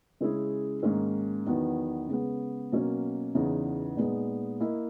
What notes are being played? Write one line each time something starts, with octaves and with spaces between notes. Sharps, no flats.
C#3 G#3 C#4 E4 G#4
G#2 D#3 A#3 C#4
E2 D#3 F#3 B3
C#3 G#3 B3
B2 F#3 A#3 C#4
E2 C#3 E3 B3 D#4
A#2 G#3 B3 D#4
A#3 E4 A#4 D#5